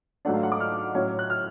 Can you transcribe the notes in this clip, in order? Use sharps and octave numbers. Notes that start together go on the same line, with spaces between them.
G#2 F#3 A3 D4 F#5
F5
F#5
D6
F6
A2 F#3 C#4
F#6
F6